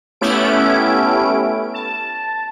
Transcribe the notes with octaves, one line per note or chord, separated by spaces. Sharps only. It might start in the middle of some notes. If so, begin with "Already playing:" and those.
A3 B3 C#4 E4 G4 D7
A5